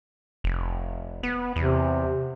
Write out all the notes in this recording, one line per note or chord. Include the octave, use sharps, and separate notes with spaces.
F1
B3
E2 C3